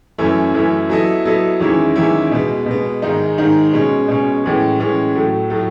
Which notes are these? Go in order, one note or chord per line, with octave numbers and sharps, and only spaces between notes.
F#2 E3 A3 C#4 E4
F#2 E3 A3 C#4 E4
F#3 B3 E4 A4 D#5
F#3 B3 E4 A4 D#5
E2 D#3 G#3 C#4 E4
E2 D#3 G#3 C#4 E4
B2 G#3 B3
B2 G#3 B3
G#2 D#3 G#3 D#4
G#2 D#3 G#3 D#4
B2 G#3 C#4
B2 G#3 C#4
A2 E3 G#3 C#4
A2 E3 G#3 C#4
A2 F#3 A3
A2 F#3 A3